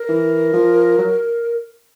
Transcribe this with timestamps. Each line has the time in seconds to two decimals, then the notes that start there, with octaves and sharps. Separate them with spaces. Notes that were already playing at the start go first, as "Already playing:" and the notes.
Already playing: A#4
0.08 E3
0.53 F3
0.98 F#3